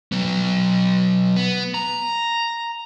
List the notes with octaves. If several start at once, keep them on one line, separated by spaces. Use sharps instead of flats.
F#3 B3
B3
A#5